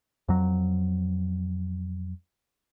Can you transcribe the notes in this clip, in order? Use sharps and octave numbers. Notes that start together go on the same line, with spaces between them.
F2 F#3